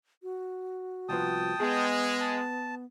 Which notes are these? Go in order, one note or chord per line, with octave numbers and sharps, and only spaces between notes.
F#4
C2 F3 B3 G5 A5 D#6
G#3 B3 G#4
A5